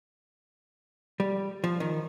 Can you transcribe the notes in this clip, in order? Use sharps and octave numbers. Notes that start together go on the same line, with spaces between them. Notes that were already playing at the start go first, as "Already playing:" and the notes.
G3
F3
D#3